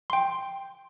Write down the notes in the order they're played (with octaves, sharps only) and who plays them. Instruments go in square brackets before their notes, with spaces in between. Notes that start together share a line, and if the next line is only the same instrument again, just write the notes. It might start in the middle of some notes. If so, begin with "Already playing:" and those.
[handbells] G5 C6